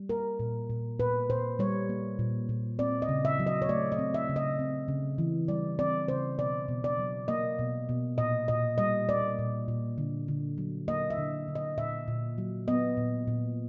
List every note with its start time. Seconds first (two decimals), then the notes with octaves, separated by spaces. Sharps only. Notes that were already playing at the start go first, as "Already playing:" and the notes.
Already playing: G3
0.09 A#3 A#4
0.39 A#2
0.70 A#2
0.99 A#2 B4
1.30 A#2 C5
1.59 G3 C#5
1.89 A#3
2.19 A#2
2.49 A#2
2.79 C4 D5
3.02 D#5
3.09 C#3
3.25 E5
3.40 F#3
3.47 D#5
3.62 C#5
3.69 A3 D5
3.92 D#5
3.99 C4
4.14 E5
4.29 C#3
4.36 D#5
4.59 C4
4.88 C#3
5.18 E3
5.48 G3 D5
5.79 C4 D5
6.08 C#3 C5
6.38 B2 D5
6.68 B2
6.84 D5
6.98 F#3
7.28 A#3 D#5
7.59 B2
7.89 B2
8.18 A#2 D#5
8.48 A#2 D#5
8.78 G3 D#5
9.08 A#3 D5
9.39 A#2
9.68 A#2
9.98 D3
10.28 D3
10.58 F#3
10.88 A#3 D#5
11.10 E5
11.18 D3
11.48 D3
11.55 D#5
11.78 A#2 E5
12.08 A#2
12.38 F#3
12.68 B3 D#5
12.97 A#2
13.28 A#2